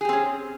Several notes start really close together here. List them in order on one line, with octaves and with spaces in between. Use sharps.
G#4 G4 C4 C#4